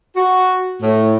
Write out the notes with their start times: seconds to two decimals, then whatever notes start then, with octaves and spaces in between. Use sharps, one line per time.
0.16 F#4
0.82 A2